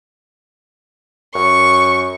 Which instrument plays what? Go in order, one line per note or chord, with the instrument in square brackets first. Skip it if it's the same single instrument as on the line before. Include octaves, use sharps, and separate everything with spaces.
[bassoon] F#2 [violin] C#6